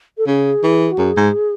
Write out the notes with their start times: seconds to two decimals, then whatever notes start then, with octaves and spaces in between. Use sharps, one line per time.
0.18 A4
0.27 C#3 G#4
0.63 E3
0.92 F#4
0.98 F#2 G#4
1.17 G#2